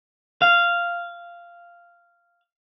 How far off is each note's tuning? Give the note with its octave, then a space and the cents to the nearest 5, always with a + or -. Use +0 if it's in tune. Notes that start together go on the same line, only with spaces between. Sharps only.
F5 -10